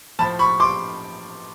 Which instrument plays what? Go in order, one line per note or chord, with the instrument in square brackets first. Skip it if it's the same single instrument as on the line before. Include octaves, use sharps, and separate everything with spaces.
[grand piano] A2 F3 A5 B5
B5 C#6
C6 D6